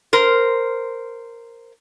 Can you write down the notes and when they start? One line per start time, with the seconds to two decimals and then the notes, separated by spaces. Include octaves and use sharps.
0.13 A#4 C5